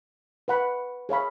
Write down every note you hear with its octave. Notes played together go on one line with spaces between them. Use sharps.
B4 F#5 B5
G#4 C#5 F5 B5